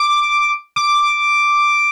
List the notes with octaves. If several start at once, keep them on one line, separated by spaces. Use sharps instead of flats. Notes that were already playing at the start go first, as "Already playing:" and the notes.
Already playing: D6
D6